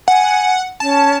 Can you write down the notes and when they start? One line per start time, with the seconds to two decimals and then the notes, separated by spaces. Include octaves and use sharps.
0.08 F#5 G#5
0.80 C#4 A5